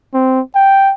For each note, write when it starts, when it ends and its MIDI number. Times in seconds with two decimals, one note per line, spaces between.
0.13 0.40 60
0.55 0.93 79